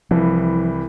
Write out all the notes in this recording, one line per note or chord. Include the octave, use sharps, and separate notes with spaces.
C2 E3 F3